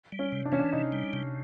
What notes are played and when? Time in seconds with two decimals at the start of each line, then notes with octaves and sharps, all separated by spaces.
0.12 G3
0.19 C#4
0.32 C3
0.45 D4
0.52 E3 C#4
0.59 D4
0.73 C3 D#4
0.92 G3
1.13 C3